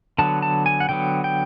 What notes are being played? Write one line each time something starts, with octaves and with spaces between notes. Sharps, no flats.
D3 F#3 B3 A5
A5
G#5
F#5
D3 F#3 B3 G5
G5